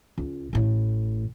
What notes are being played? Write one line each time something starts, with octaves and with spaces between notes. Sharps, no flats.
C#2
A1 A2